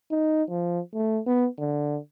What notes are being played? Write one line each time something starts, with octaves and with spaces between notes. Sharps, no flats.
D#4
F3
A3
B3
D3